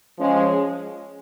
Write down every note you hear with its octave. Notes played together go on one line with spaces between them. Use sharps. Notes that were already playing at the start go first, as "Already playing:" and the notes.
F3 G#3 C#4